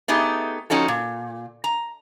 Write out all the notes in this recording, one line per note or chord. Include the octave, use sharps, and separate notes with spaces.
A3 B3 D#4 G4 G#4
F3 C#4 D#4 F#4 A4
A#2
A#5